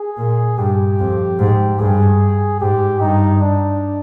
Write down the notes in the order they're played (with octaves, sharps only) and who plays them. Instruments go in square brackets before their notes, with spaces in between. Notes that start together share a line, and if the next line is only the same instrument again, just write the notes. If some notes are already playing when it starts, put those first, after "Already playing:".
Already playing: [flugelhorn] G#4
[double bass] A#2
[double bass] G2 [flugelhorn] G4
[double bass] F2
G#2
[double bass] G2 [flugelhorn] G#4
[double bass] G#2 [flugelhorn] G4
[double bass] G2 [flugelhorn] D#4
[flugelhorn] D4